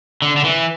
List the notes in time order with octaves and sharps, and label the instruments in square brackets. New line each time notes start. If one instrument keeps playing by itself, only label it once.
[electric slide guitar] D3
D3
E3